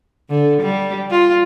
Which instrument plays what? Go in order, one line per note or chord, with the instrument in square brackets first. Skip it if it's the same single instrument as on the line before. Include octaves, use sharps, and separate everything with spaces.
[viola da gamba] D3
G3
F4